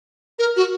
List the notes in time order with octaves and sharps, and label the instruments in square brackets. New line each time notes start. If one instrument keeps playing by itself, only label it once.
[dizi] A#4
F#4